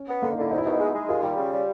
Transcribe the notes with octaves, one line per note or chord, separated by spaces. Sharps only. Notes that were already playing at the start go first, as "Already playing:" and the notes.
Already playing: C#4
B3
D3 A#3
D#4
D3 E4
C2 D#4
E4
B2 D#4
G#3
G#3
D#2 F4
G3 G4
C#3
G3